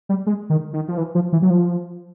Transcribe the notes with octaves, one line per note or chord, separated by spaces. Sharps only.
G3
G#3
D#3
D#3
F3
E3
F3
E3
F#3
F3